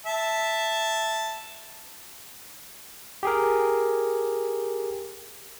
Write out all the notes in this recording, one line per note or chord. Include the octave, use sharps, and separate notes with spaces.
E5 A5
G4 G#4 A#4